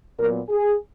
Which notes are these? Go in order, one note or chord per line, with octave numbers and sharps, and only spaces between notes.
A#2 F#3 B3 A#4
G#4